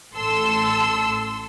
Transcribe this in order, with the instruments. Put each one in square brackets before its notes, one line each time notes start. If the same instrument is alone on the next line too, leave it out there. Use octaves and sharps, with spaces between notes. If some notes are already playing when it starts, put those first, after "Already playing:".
[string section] A1 A4 C6 E6